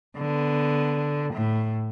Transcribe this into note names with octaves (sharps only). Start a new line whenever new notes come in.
D3 B3
A2